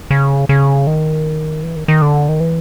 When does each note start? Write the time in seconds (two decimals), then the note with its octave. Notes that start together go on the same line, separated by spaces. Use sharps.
0.11 C#3
0.49 C#3
0.87 D#3
1.63 E3
1.76 D#3
1.88 D#3
2.02 D3
2.29 D#3
2.40 E3